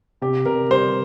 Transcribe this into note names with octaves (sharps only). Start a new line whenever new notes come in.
C3 G4
C3 A#4
G3 C5